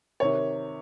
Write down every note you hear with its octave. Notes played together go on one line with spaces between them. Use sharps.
C3 D#3 C#5